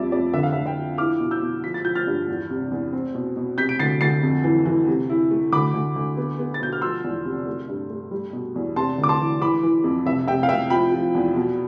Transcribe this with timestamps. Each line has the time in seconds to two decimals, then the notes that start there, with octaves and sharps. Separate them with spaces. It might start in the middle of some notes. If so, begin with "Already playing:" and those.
Already playing: F2 F3 G3 D5 E5
0.12 F2 D5
0.34 D3 E5
0.43 F5
0.53 D3 E5
0.66 E5 G5
0.77 F3
0.98 E4 D6 F6
1.20 B2
1.31 E6 G6
1.42 B2
1.64 F3 B6
1.74 A6
1.85 F3 G6
1.95 F6 A6
2.07 G2
2.28 E2
2.50 C3
2.71 E2
2.93 C4
3.15 B2
3.37 B2
3.58 C3 G6 B6
3.69 D7
3.79 D2 A6 C7
4.01 D2 A6 C7
4.23 F2
4.44 E3
4.66 E3
4.88 C3
5.10 E4
5.31 A3
5.52 D2 B5 D6
5.74 D2
5.96 D2
6.17 B3
6.39 B3
6.54 A6
6.61 B2 G6
6.72 F6
6.81 F3 C6 E6
7.04 E2
7.25 C3
7.47 A3
7.68 G2
7.90 A3
8.11 G3
8.33 B2
8.55 E2
8.76 C3 A5 C6
8.98 D2
9.04 D6
9.09 A5 C6
9.19 E3
9.41 E3 B5 D6
9.63 E3
9.84 F2
10.06 C2 E5
10.27 C3 E5 G5
10.43 F5
10.49 C2 E5 G5
10.70 F3 G5 B5
10.92 F3
11.15 E2
11.35 B2